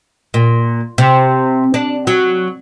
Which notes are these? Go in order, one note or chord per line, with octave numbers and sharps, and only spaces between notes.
A#2
C3
D4
F#3